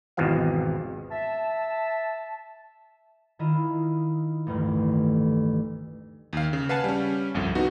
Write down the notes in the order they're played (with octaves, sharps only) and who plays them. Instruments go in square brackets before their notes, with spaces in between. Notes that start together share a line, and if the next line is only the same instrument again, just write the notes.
[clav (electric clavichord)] G#1 E2 B2 F3 F5
[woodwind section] E5 A5
[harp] D#3 E4 F4 D#5
A1 D2 G2 D#3
[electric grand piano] D#2 F5
C#3
B4 F5 F#5 G#5 A5
G3 C#4
G1 C2 F2
B3 D#4 F#4